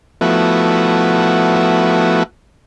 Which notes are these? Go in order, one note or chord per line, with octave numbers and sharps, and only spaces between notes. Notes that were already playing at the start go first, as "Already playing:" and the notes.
F3 A3 B3 E4 F#4